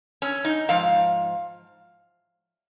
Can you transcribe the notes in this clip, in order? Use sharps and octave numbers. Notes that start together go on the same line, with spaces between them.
C#4
D#4
G#2 F3 F5